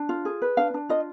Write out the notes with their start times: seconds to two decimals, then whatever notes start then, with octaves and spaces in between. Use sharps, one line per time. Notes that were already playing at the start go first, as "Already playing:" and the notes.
Already playing: D4
0.09 F4
0.25 G#4
0.42 B4
0.57 D4 F5
0.74 D4
0.89 F4 D#5